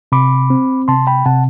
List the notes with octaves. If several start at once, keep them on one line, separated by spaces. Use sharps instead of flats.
C3 B5 D6
C4
C3 A5 C6
G5 B5
C3 F#5 A5